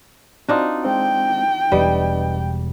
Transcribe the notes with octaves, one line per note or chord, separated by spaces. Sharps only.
C4 D4 D#4 F4 F#4
G#3 C4 G5
E1 G3 D4 B4 D#5